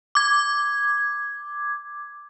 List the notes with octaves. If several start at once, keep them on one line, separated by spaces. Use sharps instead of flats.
D6 G#6